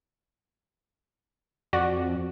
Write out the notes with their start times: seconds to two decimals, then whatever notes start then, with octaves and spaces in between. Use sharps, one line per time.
1.73 F2 F#4 D5